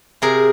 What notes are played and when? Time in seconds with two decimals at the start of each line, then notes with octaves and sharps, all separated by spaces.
0.22 C3 G#4 A#4